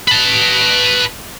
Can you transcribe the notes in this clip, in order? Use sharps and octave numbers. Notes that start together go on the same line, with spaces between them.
B4 A5